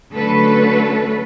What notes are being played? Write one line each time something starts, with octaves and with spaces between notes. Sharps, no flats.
D3 F#3 A3 C#4 A4 B4